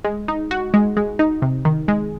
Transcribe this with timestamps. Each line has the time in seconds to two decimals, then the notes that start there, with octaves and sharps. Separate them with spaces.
0.04 G#3
0.28 D#4
0.51 F#4
0.74 G#3
0.97 G#3
1.19 D#4
1.42 C3
1.65 D#3
1.88 G#3